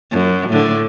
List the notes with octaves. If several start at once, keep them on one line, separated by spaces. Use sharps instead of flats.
F#2
A2 D3